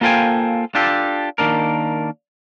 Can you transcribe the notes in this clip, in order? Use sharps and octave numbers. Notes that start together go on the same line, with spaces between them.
A#3 F4 A4 C5 G5 G#5
D4 F4 G4 A4
D#3 A#3 D4 A#4